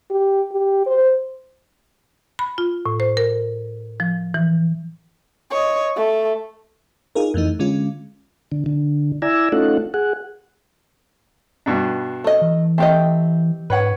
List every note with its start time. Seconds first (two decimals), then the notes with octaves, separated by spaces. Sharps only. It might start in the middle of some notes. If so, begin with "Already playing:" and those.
0.10 G4
0.52 G4
0.87 C5
2.39 B5
2.58 F4
2.86 A2
3.00 C5
3.17 A#4
4.00 F3
4.34 E3
5.50 C#5 D#5
5.96 A3
7.15 D#4 F4 G#4 A#4
7.34 F2 E3 A3 D#4
7.59 D3 G#3 C#4 F4
8.52 D3
8.66 D3
9.22 E4 D5 G#5 A#5 E6
9.52 A3 C#4 D#4 F4 A4 F#5
9.94 G#4 F#5
11.66 G2 B2 D4
12.24 A3 D#5
12.42 E3
12.78 A3 C4 G4 D#5
13.70 G#2 B4 C#5 F#5